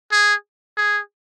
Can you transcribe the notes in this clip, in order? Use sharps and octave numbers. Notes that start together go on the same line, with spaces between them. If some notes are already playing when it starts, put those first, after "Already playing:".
G#4
G#4